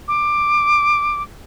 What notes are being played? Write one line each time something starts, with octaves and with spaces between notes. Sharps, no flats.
D6